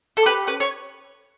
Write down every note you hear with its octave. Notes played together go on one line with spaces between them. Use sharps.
A4
G4 B4
C#4 B4
C#5